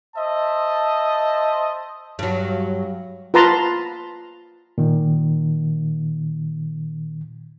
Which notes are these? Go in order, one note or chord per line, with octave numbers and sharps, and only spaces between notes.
C5 D#5 E5 A5
G2 F#3
F4 B4 A5 A#5 C6
A#2 D#3